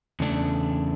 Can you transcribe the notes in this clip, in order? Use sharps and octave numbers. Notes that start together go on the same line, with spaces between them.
E2 C#3 A3 D4